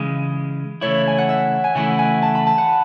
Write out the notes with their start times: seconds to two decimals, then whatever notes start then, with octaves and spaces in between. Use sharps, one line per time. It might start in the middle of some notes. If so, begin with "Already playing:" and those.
Already playing: C#3 E3 G#3
0.81 C#3 E3 A3 E4 C#5
1.07 G#5
1.18 F#5
1.29 E5
1.64 G#5
1.75 C#3 E3 A3 E4 F#5
1.99 G#5
2.22 A5
2.35 B5
2.46 A5
2.58 F#5